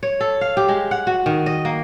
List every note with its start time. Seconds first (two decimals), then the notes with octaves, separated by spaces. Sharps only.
0.03 C#5
0.21 A4
0.41 F5
0.57 G4
0.69 G#3
0.91 F#5
1.07 F#4
1.26 D#3
1.46 D#5
1.65 A#3